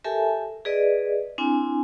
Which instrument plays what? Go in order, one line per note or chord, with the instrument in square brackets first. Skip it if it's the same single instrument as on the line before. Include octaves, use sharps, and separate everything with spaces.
[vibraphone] G4 A4 A#4 E5 G#5 A5
G#4 B4 D5 D#5
C4 D4 E4 G#5